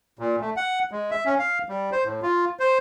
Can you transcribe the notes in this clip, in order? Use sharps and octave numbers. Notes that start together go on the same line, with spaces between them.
A#2
A3
F#5
G#3
E5
C#4
F5
G3
C5
A2
F4
C5